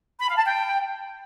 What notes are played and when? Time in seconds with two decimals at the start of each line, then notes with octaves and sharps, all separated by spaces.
0.19 B5
0.28 F5
0.37 A5
0.46 G5